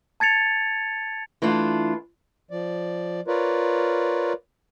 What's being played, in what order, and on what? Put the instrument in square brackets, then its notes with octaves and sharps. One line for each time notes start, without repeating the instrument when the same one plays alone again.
[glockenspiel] A5 G#6 A6 C#7 F7
[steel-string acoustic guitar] E3 A3 D4 F4
[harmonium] F3 D5
F4 A#4 B4 C#5 D5